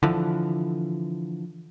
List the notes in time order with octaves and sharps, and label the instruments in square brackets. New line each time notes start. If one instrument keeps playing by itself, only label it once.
[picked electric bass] D3 E3 F3